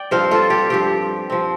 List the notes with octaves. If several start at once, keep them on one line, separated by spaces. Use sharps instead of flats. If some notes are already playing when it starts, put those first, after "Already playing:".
Already playing: D5 G5
G2 F3 C4 C5 F5
F4 A4
G4
G2 F3 C4 G4
F3 C4